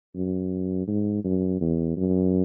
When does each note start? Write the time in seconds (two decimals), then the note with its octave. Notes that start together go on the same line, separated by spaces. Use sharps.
0.15 F#2
0.87 G#2
1.24 F#2
1.61 E2
1.97 F#2